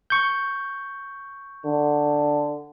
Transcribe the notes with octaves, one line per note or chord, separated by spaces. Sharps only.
C#6 G6
D3